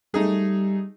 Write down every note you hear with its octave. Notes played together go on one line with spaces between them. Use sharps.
G3 A3 D#4 G#4